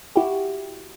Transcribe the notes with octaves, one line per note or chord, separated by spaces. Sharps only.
E4 F#4 G4